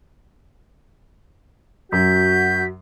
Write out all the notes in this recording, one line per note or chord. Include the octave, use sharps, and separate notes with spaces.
F#2 F#4 G6 B6